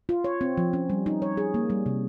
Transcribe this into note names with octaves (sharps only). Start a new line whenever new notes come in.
F4
C#5
C4
F3
C#4
G3
D#4
C#5
G#4
A#3
G3
C3